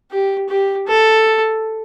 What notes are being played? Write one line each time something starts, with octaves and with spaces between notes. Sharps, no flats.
G4
G4
A4